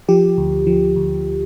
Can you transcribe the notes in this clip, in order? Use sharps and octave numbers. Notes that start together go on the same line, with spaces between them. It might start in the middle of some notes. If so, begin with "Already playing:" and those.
F3 G4
D2
F3
D2